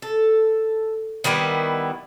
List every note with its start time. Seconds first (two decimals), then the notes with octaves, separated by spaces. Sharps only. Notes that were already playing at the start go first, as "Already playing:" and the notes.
0.02 A4
1.24 D#3 G3 B3 E4